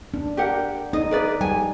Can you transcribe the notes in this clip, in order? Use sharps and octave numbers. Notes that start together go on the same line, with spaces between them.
D4
G4 A#4 F#5
D#4 D#5
A#4 B4 D5
G3 G#5